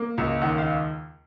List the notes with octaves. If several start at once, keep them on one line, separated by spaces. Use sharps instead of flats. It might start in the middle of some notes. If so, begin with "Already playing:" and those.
Already playing: A#3
C#2
D#2 F#5
F5